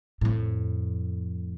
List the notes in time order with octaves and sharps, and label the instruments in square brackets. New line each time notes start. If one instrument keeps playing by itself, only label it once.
[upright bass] F2 A2